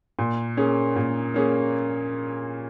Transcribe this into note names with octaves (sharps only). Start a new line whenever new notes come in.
A#2
A#3 C#4 G#4
A#2
A#3 C#4 G#4